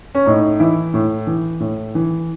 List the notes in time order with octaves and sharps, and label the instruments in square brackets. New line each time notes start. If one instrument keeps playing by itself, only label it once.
[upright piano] C#4
A2 D#4
E3 E4
A2
E3
A2
E3